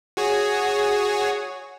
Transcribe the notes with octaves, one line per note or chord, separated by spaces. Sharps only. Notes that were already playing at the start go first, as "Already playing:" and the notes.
F#4 G#4 C#5